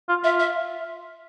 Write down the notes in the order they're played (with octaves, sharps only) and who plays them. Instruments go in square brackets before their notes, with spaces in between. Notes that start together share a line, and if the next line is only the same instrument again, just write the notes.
[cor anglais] F4
[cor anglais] F4 [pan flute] E5
[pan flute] E5